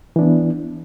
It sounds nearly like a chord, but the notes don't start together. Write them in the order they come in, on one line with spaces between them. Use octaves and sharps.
E3 D4 B3